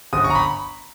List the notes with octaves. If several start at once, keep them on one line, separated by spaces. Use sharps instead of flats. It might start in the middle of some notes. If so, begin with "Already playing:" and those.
G1 D#6
C#6
A#5
B5